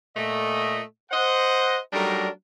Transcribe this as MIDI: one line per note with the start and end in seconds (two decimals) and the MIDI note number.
0.16 0.81 46
0.16 0.81 57
0.16 0.81 75
1.10 1.78 72
1.10 1.78 75
1.10 1.78 78
1.92 2.28 54
1.92 2.28 55
1.92 2.28 57
1.92 2.28 62
1.92 2.28 63
1.92 2.28 70